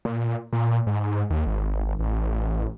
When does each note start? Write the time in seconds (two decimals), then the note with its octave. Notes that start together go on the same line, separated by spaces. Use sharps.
0.05 A#2
0.53 A#2
0.87 G#2
1.30 D#2
1.46 G#1
1.99 A1